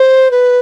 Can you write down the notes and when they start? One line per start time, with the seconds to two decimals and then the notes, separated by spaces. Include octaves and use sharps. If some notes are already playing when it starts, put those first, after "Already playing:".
Already playing: C5
0.31 B4